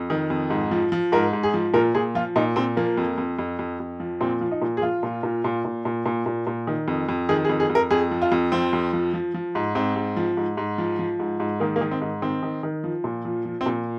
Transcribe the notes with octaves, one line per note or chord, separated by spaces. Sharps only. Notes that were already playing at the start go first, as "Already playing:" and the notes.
Already playing: F2
D#3
F2
G#2
F3
F3
G#2 A#4
G#2
G#4
F3
A#2 A#4
A#2 G#4
F3 F4
A#2 D#4
A#2 C4
F3 A#3
F2
F2
F2
F2
F2
F3
A#2 C4
F3
D#4
A#2
G#4
F3 F4
A#2
A#2
A#2
A#2
A#2
A#2
A#2
A#2
D#3
F2
F2
D#3 G#4
G#4
F2
G#4
F2
A#4
F2 G#4
F3
F4
F2
F3 C4
F2
F3
F3
F3
G#2
G#2 C4
G#2
F3
G#2
G#2
F3
F3
G#2
G#2
D#3 A#3
A#3
D#3
C4
G#2
D#3 C4
D#3
D#3
F3
A#2
F3
F3
C4
A#2